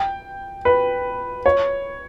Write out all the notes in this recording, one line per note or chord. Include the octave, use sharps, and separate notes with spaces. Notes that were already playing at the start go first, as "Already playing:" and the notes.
Already playing: G5
B4
C#5